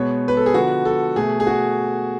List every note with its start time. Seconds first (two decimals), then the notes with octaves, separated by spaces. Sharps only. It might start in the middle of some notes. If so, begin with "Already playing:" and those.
Already playing: B2 G#3 B3 C#5
0.28 B4
0.37 A4
0.46 G#4
0.54 D3 F3 B3 F#4
0.85 A4
1.16 B2 A3 G#4
1.40 G#4
1.47 F#4